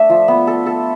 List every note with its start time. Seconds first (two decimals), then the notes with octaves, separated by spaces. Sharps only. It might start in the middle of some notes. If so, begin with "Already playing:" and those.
Already playing: A3 D4 E5
0.10 F3
0.28 B3
0.47 A4
0.66 A4